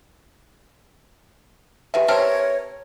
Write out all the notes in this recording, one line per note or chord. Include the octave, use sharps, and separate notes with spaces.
B2 D#3 G#3 G4 B4 E5
C4 A4 A#4 C#5